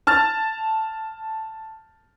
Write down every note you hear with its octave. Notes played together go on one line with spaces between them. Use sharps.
A5 F6 A6